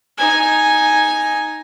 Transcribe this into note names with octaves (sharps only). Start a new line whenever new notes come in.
D#4 G#5